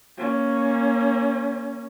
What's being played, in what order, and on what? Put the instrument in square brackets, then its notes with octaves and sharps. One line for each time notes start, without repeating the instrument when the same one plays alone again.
[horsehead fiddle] A#3 C#4